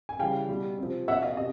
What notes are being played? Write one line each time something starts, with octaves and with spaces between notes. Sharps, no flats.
G#5
C#3 E3 G3 F5 G5
B2 G3
C3 F3
B2 F#3 E5 F#5
D#5 F5
C3 D#5